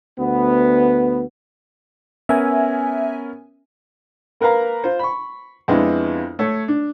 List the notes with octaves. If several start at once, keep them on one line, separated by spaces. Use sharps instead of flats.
D2 B3
B3 C#4 A#4 E5 G#5
A#3 A#4 B4 F5 A#5
F4 C5
B5 C#6
F2 G#3 B3 D4 E4
A3 C#5
D4